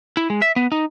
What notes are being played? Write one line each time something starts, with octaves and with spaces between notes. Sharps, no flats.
E4
G#3
E5
B3
D#4